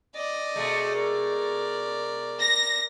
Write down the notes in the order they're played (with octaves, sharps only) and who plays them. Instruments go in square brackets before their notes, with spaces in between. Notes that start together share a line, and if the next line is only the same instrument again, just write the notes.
[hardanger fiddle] D5 D#5
[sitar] B2 G#3 A3
[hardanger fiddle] A#4 D5
[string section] A#6